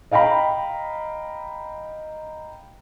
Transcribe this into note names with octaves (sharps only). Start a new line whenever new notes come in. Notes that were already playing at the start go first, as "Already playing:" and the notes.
D#5 F5 G5 A#5 B5